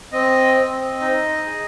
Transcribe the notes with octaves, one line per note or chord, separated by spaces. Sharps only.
C4 D#5
C4
D#4
G#4